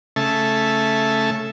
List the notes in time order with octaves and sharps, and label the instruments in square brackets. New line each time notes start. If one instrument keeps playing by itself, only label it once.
[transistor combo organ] C#3 A3 E5 A5